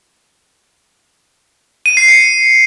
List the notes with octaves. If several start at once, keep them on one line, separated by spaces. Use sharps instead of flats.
D#7
C7
C#7